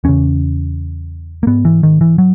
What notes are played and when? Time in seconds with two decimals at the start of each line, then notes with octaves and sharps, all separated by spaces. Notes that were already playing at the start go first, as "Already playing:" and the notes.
0.04 E2 C#3 C#4
1.43 A#3
1.47 G#2 B3
1.65 E3
1.83 D#3
2.01 E3
2.18 F#3